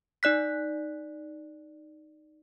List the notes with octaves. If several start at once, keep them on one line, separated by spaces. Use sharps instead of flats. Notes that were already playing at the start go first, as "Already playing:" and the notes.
D#4 D5 F#6 B6